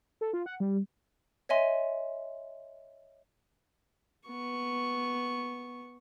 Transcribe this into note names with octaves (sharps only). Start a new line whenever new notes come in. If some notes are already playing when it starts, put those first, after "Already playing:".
A4
F4
F#5
G3
C#5 D#5 E5 G#5 C6
B3 C#6